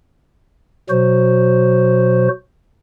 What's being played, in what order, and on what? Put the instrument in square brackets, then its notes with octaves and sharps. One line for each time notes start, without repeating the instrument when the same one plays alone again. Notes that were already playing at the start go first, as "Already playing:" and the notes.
[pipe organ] B2 F#3 F#4 C5